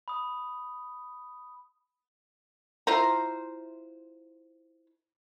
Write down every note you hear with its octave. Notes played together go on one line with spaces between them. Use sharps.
B5 D#6
E4 F4 C5 A#5